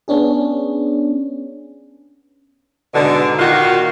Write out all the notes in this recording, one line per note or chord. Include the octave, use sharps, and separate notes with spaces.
B3 C#4 D4 G#4
G#2 B2 D3
A#2 D#3 F4 F#4